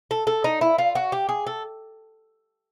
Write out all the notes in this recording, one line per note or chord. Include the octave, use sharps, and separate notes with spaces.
A4
A4
D#4
E4
F4
F#4
G4
G#4
A4